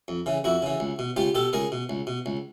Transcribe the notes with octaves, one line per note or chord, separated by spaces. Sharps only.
F2
C#3 E3
F2 E4 F#4
C#3 E3
C#2
B2
C#2 F4 G4
B2 G4 A4
C#2 G#4 A#4
B2
C#2
B2
C#2